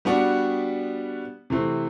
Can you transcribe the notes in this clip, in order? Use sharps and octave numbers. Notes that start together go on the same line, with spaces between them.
G3 B3 D4 F#4
C3 E3 A3 C4